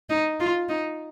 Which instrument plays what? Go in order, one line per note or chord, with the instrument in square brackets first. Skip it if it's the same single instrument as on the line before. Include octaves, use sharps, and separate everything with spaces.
[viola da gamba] D#4
F4
D#4